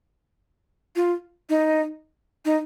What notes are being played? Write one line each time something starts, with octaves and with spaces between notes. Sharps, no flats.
F4
D#4
D#4